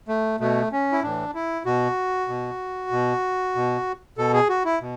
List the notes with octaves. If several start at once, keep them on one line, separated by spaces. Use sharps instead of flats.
A3
B2 A3
C#4
E4
A2 E3 D4
E4
B2 F#4
B2
B2
B2
B2 A4
G#4
F#4
E4
B2